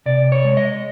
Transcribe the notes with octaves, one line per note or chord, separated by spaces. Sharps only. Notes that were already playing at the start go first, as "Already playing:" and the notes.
C3 D5
C#5
G#3
D#5